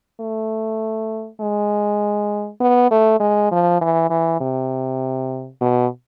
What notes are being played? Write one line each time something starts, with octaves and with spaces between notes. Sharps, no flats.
A3
G#3
B3
A3
G#3
F3
E3
E3
C3
B2